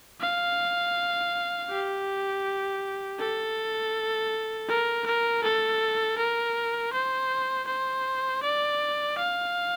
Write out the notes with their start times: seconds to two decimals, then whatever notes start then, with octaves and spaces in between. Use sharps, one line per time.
0.20 F5
1.70 G4
3.19 A4
4.69 A#4
5.06 A#4
5.44 A4
6.18 A#4
6.93 C5
7.67 C5
8.43 D5
9.18 F5